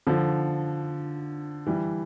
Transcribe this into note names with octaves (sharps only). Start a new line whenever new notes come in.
D3 F3
E3 G3